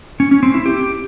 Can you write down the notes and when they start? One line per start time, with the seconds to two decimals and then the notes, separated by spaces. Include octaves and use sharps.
0.20 C#4
0.31 C#4
0.43 C4
0.54 E4
0.66 G4